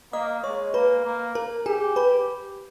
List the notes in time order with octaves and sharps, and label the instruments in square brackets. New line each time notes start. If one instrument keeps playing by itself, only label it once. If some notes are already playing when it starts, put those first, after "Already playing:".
[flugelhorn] A#3 [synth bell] D#5 D#6
[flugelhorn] G#3 [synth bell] C#5 C#6
[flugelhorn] A#3 [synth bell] B4 B5
[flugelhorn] A#3
[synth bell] A#4 A#5
[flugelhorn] G4 [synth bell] G#4 G#5
[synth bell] B4 B5